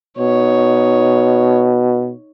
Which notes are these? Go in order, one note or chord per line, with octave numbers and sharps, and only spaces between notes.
B2 D#4 C#5